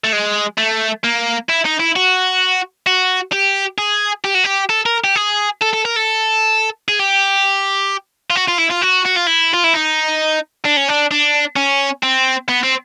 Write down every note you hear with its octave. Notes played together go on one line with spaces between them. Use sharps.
A3
G#3
A3
A#3
E4
D#4
E4
F#4
F#4
G4
G#4
G4
F#4
G4
A4
A#4
G4
G#4
A4
A4
A#4
A4
G#4
G4
F4
F#4
F4
E4
F4
F#4
F#4
F4
E4
F4
E4
D#4
D4
C#4
D4
D4
C#4
C4
B3
C4